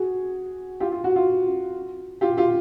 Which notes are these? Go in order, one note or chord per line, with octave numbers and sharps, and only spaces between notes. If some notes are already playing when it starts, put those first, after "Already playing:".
Already playing: F#4 G#4
F4 G4
F4
F#4
F4
F4 G4
F4 G4